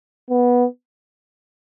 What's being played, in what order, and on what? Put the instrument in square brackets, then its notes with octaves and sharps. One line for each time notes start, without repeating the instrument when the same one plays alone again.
[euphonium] B3